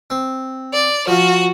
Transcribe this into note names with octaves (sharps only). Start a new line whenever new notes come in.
C4
D5
F3 F4 F#4